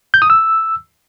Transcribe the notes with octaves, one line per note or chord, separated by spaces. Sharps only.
G6
D#6
E6